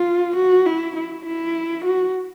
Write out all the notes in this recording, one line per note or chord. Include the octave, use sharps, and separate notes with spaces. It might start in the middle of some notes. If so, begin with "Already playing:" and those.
Already playing: F4
F#4
E4
E4
E4
F#4